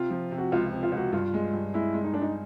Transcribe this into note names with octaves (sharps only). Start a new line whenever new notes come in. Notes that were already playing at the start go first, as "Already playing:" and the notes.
Already playing: C3 F4
F3
C3
F#4
C#2 F4
C3
F4
C#2
F#4
G2 F4
G#3
G2
G#3 E4
G#3
D#4
G#3 D4
D#4